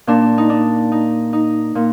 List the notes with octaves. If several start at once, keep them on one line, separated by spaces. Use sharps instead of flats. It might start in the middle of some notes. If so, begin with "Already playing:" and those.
A#2 D4
D#4
D4
D#4
D#4
A#2